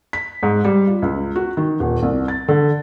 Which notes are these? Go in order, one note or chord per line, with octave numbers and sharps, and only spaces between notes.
B6
G#2
G3
F4
C#2
F#4
D#3
D#1
C2
A6
D3